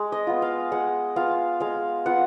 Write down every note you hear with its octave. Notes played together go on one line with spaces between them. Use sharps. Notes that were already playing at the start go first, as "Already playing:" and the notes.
Already playing: G#3
D#5
B3 F4
F5
G#3 F#5
B3 F4 F5
G#3 F5
B3 F4 F#5